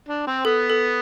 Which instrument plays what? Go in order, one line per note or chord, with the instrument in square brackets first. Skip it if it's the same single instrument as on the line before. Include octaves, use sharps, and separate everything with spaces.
[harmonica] D4
C4
[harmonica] B3 [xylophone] A4
[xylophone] A4